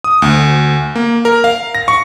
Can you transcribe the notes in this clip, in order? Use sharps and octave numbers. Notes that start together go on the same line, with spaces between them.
D#6
D2
A#3
A#4
F5
A#6
C#6